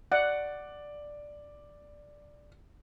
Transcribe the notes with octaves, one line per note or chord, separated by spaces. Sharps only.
D5 F#5